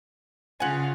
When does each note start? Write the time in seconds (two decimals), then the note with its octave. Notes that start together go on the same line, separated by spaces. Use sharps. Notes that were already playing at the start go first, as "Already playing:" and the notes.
0.60 C#3 F4 F#5 G#5